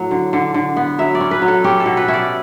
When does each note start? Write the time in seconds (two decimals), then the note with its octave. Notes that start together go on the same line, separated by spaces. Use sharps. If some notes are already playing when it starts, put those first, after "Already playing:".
Already playing: A2 F#3
0.11 D3
0.33 D3
0.54 D3
0.77 B3
0.98 F#3 E5
1.15 D5
1.20 C#4
1.31 B4
1.42 F#3
1.48 A4
1.64 C#4 G4
1.80 A4
1.86 B2
1.97 B4
2.08 C#4 E5
2.14 D5